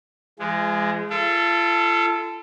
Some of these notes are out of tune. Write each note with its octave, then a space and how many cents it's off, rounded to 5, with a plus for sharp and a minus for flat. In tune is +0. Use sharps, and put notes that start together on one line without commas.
F3 -45 G#3 +0
F4 -40 A4 +0